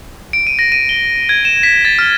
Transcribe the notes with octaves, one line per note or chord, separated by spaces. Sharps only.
D7
D#7
A#6
D#7
G7
G#6
E7
B6
A6
F6